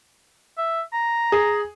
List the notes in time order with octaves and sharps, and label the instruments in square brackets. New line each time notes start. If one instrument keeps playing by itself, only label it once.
[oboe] E5
A#5
[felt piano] G#4